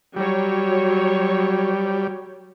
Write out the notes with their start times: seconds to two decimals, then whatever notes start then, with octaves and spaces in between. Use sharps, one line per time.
0.16 F#3 G3 C#5